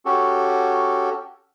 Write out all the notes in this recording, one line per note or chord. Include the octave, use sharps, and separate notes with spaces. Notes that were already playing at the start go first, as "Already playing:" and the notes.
C#4 F#4 G4 A4